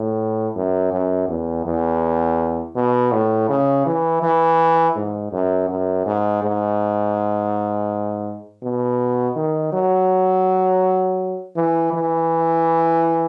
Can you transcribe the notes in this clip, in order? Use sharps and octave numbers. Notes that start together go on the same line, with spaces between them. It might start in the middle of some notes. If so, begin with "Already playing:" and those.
Already playing: A2
F#2
F#2
E2
E2
B2
A2
C#3
E3
E3
G#2
F#2
F#2
G#2
G#2
B2
D#3
F#3
E3
E3